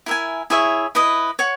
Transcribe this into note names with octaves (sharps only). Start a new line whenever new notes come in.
E4 A#4 E5 G#5
E4 G#4 C#5 E5
E4 B4 D#5
C#5 F#5